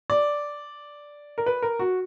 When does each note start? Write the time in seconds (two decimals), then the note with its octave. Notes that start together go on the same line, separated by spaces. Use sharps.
0.10 D5
1.38 A#4
1.46 B4
1.62 A#4
1.79 F#4